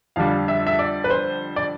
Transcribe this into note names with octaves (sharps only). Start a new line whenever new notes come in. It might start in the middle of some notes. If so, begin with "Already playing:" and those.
F2 D3 G3 D4 F5
E5
E5
D5
B4
C5
D5